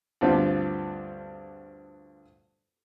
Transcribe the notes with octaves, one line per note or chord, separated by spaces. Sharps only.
D2 G2 F3 B3 C4